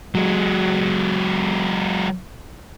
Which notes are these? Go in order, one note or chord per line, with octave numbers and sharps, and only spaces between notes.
F#3 G#3